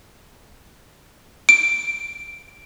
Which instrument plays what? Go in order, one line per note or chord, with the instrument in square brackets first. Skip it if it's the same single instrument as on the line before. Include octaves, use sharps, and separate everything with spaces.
[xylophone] D7